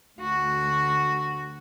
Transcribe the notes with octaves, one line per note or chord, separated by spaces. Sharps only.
D2 F#4